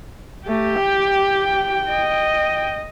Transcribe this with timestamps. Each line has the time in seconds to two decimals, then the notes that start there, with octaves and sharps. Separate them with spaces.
0.47 A3 G4
0.80 G5
1.90 D#5